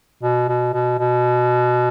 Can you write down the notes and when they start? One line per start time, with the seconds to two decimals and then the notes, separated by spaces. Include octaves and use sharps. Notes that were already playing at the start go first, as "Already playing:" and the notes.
0.23 B2
0.48 B2
0.73 B2
0.99 B2